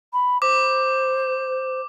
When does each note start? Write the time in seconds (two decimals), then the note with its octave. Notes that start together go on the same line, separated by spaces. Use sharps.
0.13 B5
0.42 C5 D6